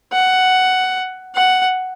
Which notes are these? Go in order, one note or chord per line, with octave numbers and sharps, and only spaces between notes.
F#5
F#5